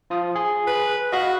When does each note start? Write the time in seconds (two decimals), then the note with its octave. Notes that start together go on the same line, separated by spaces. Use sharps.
0.10 F3 F4 D#6
0.35 G#4
0.67 B4
1.12 F#4 D#5 F5 B5